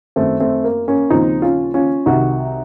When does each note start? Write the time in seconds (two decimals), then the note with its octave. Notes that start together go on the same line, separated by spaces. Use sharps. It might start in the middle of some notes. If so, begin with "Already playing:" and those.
0.16 F#2 D#3 A3 C4
0.40 A3 C4
0.64 A#3
0.88 A#3 C#4
1.10 D#2 C#3 F3 C4 D#4
1.42 C#4 F4
1.74 C#4 F4
2.06 C2 C3 D#3 D#4 F#4